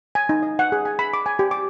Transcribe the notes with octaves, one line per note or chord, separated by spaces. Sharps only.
G#5
D#4
D#5
F#5
G#4
G#5
B5
D6
G#5
G4
D6